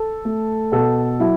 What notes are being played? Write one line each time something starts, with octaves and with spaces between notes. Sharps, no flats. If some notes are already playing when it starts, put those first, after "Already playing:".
Already playing: A4
A3
B2 A4
F#3 E4